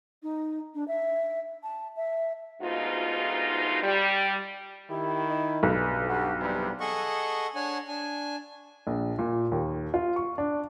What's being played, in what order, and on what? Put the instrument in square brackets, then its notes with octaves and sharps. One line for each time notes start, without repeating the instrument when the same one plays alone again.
[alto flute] D#4
D4
E5
A5
E5
[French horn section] D2 G#2 B2 D#4 F4
G3
[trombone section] D#3 E4 [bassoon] G4
[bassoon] D#4
[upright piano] B1 [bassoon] G2
[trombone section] G2 [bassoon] F#4
[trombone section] E2 C3 G3 [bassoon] G2
[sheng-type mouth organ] G#4 A4 D#5 F#5 C#6
D4 C#5 F#5 G#5
D4 G#5
[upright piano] A#1
A#2
D#2
F4
C#6
D4